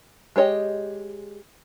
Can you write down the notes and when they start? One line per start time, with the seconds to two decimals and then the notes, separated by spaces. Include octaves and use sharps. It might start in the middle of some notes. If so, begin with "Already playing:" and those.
0.36 G#3 G4 C#5 D#5